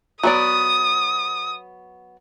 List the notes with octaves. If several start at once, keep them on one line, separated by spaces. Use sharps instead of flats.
F#3 B3 D5 D#6